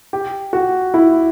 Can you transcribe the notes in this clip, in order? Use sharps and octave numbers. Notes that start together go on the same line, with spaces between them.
G4
F#4
E4